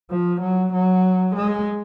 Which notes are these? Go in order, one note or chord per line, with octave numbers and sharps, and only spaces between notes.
F3
F#3
F#3
G#3